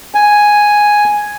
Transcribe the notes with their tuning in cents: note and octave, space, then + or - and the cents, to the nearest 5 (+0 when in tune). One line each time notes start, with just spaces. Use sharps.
G#5 +0